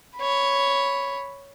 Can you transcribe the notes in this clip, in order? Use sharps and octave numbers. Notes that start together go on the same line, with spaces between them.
C#5 B5